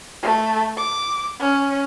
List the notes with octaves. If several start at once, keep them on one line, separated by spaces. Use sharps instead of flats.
A3
D6
C#4